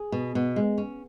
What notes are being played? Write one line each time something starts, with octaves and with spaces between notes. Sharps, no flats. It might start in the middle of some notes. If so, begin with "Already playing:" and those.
Already playing: G#4
B2
B2
G#3
C#4